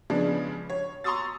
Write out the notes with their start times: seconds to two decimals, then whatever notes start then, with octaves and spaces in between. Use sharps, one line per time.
0.10 C#3 F3 G#3 B3 D4
0.70 C#5
1.04 A#5 C6 C#6 D#6 E6 A6